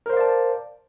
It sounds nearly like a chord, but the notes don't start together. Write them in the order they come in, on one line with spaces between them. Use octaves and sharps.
A#4 C5 F5 D5 A5